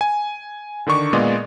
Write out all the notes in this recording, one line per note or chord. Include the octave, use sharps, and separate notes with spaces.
G#5
D3 D#3 D4 C#6 D6
A#2 G#3 B3 D5 D#5 C6